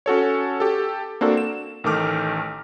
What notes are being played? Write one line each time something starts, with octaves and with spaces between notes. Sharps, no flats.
C#4 F#4 A4 C#5
G4 A4
A#3 C4 D4 F#4 A4
E7
A1 D#3 A3 D6 F6